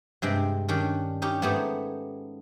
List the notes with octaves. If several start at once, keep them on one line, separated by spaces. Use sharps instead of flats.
G2 C3 G#3 G5
D#3 G3 C#4 D4
C#4 D#4 G4
G#2 A3 B3 G4 G#4